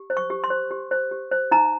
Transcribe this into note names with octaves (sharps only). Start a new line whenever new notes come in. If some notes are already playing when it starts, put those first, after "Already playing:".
Already playing: G4
C5
C#6
G4
C6
C5
G4
C5
G4
C5
D#4 A#5